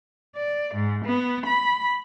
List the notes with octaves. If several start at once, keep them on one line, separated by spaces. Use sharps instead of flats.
D5
G#2
B3
B5